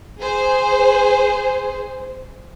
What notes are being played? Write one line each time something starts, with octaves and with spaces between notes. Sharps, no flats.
G#4 C5